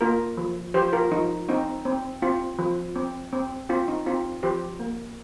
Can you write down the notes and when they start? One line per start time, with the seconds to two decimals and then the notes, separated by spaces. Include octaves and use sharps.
0.01 A#3 F4 A#4
0.37 F3
0.74 F3 G4 C5
0.93 F4 A#4
1.11 F3 D#4
1.49 C4 D#4
1.85 C4
2.22 C4 F4
2.59 F3
2.96 C4
3.33 C4
3.69 C4 F4
3.88 D#4
4.06 C4 F4
4.43 F3 G4 C5
4.80 A#3